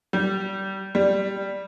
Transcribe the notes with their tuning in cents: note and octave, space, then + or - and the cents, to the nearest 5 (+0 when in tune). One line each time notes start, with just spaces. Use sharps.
G3 -20
G3 +0